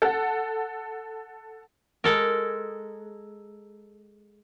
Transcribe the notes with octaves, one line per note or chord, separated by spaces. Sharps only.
A4 F#5
G#3 A4 A#4